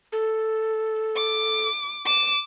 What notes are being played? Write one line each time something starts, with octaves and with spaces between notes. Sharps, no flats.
A4
D6
D6 E7